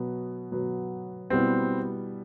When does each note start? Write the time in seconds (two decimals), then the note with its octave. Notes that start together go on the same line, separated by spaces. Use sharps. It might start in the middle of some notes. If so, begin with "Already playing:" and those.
Already playing: B2 F#3 B3
0.51 B2 F#3 B3
1.30 B2 G3 B3 C4 E4